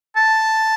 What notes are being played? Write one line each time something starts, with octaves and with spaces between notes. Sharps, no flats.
A5